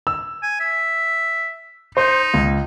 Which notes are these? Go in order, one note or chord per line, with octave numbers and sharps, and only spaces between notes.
E6
G#5
E5
D#4 C5 C6
C#2